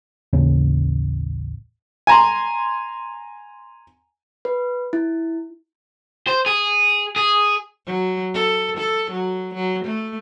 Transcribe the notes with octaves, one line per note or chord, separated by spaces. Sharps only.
A1 D#2 C#3 C#4
G#5 A#5 C6
B4
E4
C5
G#4
G#4
F#3
A4
A4
F#3
F#3
A3